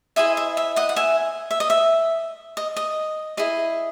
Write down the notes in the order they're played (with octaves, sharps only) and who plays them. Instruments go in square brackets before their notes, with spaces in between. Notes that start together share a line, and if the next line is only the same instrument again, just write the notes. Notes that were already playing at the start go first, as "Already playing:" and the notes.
[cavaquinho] E4 G#4 C5 D#5 E5 G#5
E5
E5
D#5 F#5
F#5
E5 G#5
E5
D#5
E5
D#5
D#5
E4 G#4 D#5